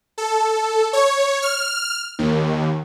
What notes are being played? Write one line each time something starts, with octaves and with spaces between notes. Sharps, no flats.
A4
C#5
F6
D#2